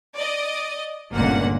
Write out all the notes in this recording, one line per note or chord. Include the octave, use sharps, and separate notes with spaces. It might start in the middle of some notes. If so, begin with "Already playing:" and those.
D5 D#5
G1 C#2 A#2 D3 A#3 F#5